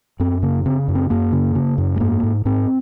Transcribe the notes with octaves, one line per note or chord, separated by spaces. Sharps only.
F#2 C4
C#3 A#3
C#3 C4
F#2
C4
F#2 A#3
C#3
C#3
F#2
G#3
G#2 A#3
G#2
G#2 C4